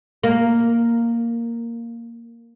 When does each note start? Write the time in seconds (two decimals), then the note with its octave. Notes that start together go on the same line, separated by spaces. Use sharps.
0.23 A#3